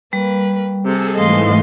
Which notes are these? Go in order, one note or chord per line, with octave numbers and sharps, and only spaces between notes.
G3 A#3 B4
C3 G#4 A4
G#2 E3 A3 D#5 F5 C6